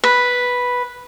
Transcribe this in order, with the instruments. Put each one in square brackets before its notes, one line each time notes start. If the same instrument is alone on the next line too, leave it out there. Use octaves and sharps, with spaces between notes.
[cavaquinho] B4